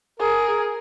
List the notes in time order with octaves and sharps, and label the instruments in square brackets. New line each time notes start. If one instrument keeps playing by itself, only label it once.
[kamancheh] G#4 [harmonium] A#4